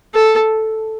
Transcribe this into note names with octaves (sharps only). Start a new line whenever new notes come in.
A4